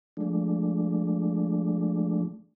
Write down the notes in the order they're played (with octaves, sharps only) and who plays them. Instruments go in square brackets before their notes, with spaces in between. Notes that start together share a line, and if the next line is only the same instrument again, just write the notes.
[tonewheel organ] F3 G#3 A3 D4